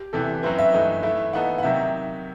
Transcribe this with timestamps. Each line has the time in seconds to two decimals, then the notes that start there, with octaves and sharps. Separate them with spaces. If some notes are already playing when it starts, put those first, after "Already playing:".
Already playing: G4
0.13 E2 C3 E3 A4
0.43 F#2 F#3 C4 E4 B4
0.59 E5
0.72 G2 E3 A3 D#4
1.03 E3 A3 E4 E5
1.33 E3 B3 D#4 A4 F#5
1.58 F#5
1.63 C3 D#3 F#3 E5